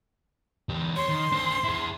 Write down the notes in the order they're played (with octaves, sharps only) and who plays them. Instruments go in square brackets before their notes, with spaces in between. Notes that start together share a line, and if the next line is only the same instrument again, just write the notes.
[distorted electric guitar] E2 G4
[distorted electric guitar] C#5 [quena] C6
[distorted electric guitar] D#3
D4 C5
E4 G#4